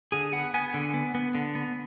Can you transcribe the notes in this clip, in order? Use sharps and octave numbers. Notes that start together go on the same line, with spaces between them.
D3 G#4
B3 F#5
B3 G#5
D3
B3
B3
D3
B3